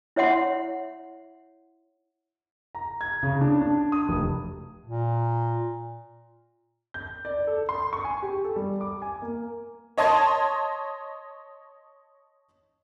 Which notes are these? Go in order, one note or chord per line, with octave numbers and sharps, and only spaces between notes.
E4 C#5 E5 F#5 C6
A#5
G#6
C#3
D4
D4
D#6
F1
A#2
G6
D5
A4
C6
C#6
G#5
G4
A4
G3
D6
G#5
A#3
C#5 D#5 A5 C6 G#6